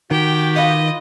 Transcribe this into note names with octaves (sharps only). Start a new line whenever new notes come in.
D#3 F#4 G4 G5
D#4 F4 B4 D#5